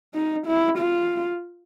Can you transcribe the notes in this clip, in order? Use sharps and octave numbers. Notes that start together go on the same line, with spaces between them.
D#4
E4
F4